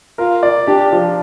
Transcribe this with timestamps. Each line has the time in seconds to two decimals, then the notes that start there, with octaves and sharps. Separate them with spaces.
0.18 F4 A#4
0.43 D5
0.67 D4 G4
0.92 F3